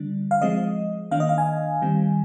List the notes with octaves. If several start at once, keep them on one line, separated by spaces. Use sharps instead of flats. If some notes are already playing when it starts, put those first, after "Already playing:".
Already playing: D3 G3 D4
F5
F3 G#3 C4 D#5
D#3 A#3 D4 F5
D#5
F5
G#5
D#3 G3 C4